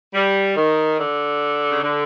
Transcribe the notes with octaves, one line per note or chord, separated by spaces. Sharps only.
G3
D#3
D3
C#3
D3